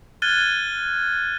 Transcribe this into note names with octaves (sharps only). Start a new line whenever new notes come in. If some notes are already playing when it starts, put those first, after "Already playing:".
F6 F#6 G#6 A6 D#7 G7